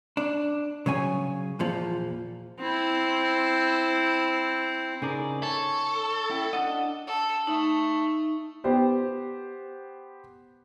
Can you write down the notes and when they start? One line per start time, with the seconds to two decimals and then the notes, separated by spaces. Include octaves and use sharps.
0.17 D4
0.86 C#3 F#3 C#5 G#5
1.59 E2 A#2 F3
2.60 C4 E4
5.02 C#3 D#4 G#4 A#4 D5
5.43 A4 C#5
6.30 C#4 E4 G5
6.53 D4 D#5 F#5
7.07 A4
7.47 A3 D#4
8.64 B3 G4 C5